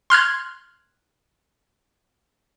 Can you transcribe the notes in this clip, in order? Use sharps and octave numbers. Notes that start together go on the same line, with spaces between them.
C6 F6 F#6 G#6